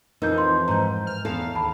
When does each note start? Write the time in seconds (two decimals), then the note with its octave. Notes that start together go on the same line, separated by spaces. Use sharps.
0.22 F2 E3 F3 D#4 A#4 G6
0.38 C6
0.68 G#2 A#5 G6
1.07 F6
1.25 E2 A4 F5
1.55 D#2 A5 B5